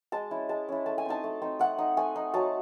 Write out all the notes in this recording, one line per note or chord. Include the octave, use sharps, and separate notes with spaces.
G#3 A5
C#4 E4
G#3 A5
C#4 E4
A3 A5
G#5
C4 D#4 A5
A3
C4 D#4
A3 F#5
D#4
A3 G#5
D#4
F#3 A5